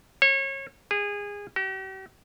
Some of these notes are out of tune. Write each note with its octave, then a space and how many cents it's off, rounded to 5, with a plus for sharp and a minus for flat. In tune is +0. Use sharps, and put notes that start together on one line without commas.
C#5 -30
G#4 -25
G4 -45